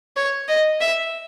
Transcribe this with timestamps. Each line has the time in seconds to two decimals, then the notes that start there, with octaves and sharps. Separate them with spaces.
0.17 C#5
0.48 D#5
0.80 E5